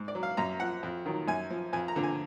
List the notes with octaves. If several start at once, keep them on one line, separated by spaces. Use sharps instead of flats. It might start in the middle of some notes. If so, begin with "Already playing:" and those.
Already playing: G#2
D5
F#3
F5
F#2 A#5
F3 F#5
F2
D#3 F#3
F#2 G#5
F3
F2 G#5
A#5
D3 F3
G#5